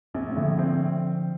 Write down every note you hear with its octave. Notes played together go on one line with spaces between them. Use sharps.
A#1 C4
D4
A3 C4
A2 D3 F3
C4